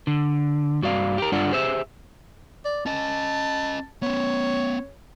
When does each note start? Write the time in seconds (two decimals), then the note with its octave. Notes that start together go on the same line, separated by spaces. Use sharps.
0.07 D3
0.82 G2 F#4 D5 F5
1.18 G4 A#4
1.32 G2 D4 F4 A4 D5 F#5
1.51 G4 G#4 C5 C#5 E5
2.65 D5
2.86 C#4 D#5 A5
4.02 B3 C#4 C#5